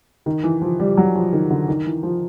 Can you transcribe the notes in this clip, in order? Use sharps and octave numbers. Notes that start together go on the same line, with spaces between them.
D#3
E3
F3
G3
F#3
F3
D#3
D3
D#3
E3
F3